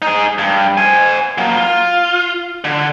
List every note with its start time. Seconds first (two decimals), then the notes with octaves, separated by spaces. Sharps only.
0.02 D#4 G#4
0.38 G2
0.78 C5 G#5
1.38 F#3 A#3
1.56 F4
2.64 D3